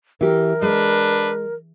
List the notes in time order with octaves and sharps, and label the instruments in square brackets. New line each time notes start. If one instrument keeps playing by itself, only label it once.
[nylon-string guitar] E3 G4 [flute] A#4
[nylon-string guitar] G#3 [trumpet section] D4 B4